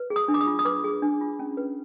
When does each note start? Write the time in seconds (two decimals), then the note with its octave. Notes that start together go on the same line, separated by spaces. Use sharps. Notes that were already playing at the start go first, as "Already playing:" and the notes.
Already playing: B4
0.10 G#4
0.16 D#6
0.28 D4
0.34 D6
0.41 D#6
0.47 F4
0.59 D#6
0.65 B4 D6
0.84 G#4
1.02 D4
1.21 F4
1.39 C#4
1.57 B4